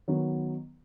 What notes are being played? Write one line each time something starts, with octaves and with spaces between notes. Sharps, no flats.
D#3 F#3 B3